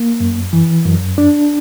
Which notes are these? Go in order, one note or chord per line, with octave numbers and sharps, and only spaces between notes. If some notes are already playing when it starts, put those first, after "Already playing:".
Already playing: A#3
F#2
E3
F#2
D4